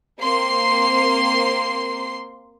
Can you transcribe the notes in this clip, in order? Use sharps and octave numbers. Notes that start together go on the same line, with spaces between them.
A#3 C4 C6 C7